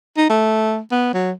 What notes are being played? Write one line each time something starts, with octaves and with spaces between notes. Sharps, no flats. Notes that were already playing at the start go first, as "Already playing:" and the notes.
D#4
A3
B3
F#3